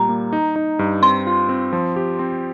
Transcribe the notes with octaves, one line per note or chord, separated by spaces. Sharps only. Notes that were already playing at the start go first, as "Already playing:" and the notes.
Already playing: A#2 G3 A#5
A#3
D#4
D#4
G2
C4 C6
F4
C4
F3
G4
C4